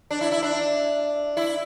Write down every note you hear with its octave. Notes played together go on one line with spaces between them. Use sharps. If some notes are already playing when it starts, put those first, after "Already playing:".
D4
E4
E4
D4
E4